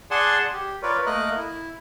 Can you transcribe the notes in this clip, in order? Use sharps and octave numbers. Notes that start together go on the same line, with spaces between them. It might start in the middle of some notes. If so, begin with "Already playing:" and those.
G#4 D5 F#5 G#5 A5 C6
G4
F4 A#4 B4 C#5 D5
A3 A#3 A#4 D#5 F#6
E4